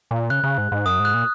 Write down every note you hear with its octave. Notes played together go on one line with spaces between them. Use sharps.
A#2
C#3 F#6
C#3
G#2
G#2
F#2 D#6
G#2
F#6
A#2